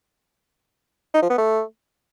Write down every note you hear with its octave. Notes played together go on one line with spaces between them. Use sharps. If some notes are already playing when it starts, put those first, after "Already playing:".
D#4
F3
B3
A3